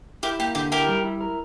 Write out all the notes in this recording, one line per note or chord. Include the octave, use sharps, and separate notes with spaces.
E4 G4 A#4
A#3 G4
D3 G4
E4 G4 A#4
G3
E4
A#4